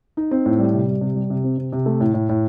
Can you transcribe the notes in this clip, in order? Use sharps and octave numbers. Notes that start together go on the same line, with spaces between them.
D#4
C4
A2
G3
C3
G3
C3
G3
C3
C4
C3
C3
A3
A2
A2
A2